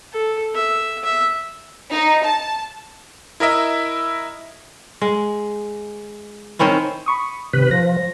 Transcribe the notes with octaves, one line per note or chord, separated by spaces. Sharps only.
A4
E5
E5
D#4
A5
E4 A#4 D#5 E5
G#3
D#3 C4 C#4 E4
B5 C#6 D#6
C3 D#3 B4 B6
F3 A#6